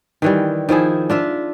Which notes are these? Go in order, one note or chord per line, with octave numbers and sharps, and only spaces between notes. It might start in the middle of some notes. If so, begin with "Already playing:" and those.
D#3 E3 G3
D#3 F3 E4 G#4
D4 F4 E5